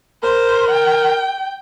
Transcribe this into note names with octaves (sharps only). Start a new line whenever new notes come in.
A#4 C5
G5